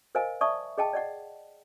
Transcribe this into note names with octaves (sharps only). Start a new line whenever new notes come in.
A#4 C5 D#5 F5 G#5
D5 E5 A5 C#6 D#6
G#4 D#5 G5 A5
D5 D#5 F#5